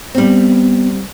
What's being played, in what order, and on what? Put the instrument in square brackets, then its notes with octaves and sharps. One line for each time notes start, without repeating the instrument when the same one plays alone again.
[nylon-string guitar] G3 C4 [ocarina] B3